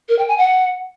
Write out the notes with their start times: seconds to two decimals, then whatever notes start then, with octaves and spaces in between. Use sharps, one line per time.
0.09 A#4
0.19 G5
0.28 G#5
0.38 F#5